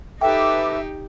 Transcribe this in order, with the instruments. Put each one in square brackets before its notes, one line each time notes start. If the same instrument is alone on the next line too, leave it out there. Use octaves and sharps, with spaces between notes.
[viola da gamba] D#4 G4 [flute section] A4 B4 D6 [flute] E5 [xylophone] G5